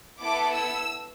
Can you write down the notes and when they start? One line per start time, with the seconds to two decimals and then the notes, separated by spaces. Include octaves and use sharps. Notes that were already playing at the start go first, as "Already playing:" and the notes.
0.21 B3 E4 A4 D6
0.53 E6